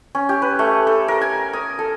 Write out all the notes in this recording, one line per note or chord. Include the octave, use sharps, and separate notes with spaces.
C#4
G4
B4
A3
A4
A#4
G#5
D#6
A4